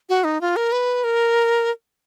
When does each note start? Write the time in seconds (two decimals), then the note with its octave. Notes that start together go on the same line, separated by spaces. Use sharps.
0.09 F#4
0.24 D#4
0.41 F4
0.56 A#4
0.72 B4
1.04 A#4